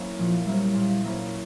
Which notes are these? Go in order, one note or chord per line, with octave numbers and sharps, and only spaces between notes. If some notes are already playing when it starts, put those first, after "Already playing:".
Already playing: F#3 A#3 C#4 E4
A#2 F3
F#3 G3 A#3 C#4 E4
A#2
F#3 A#3 C#4 E4